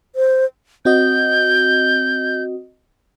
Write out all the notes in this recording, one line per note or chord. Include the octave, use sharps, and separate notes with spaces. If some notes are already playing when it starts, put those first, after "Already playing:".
C5
C4 F#4 D#5 G6